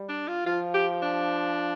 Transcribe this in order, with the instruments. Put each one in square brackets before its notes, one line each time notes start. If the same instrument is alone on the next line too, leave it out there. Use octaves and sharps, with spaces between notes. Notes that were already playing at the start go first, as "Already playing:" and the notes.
Already playing: [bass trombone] G3
[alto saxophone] D4
F4
[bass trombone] F3 [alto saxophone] F4
[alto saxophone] G4
D4